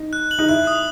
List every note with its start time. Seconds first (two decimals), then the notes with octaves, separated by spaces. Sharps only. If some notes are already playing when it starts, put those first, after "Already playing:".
Already playing: D#4
0.13 F#6
0.31 F#7
0.39 D#4
0.49 E4 F#6
0.67 D#6